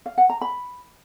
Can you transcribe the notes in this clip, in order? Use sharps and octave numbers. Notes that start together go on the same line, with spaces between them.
F5
F#5
A#5
B5